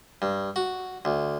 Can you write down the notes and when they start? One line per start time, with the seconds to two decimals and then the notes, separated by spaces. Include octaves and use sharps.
0.22 G2
0.56 F#4
1.05 D2